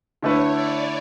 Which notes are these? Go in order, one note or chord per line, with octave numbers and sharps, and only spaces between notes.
D3 A3 E4 B4 C#5
D5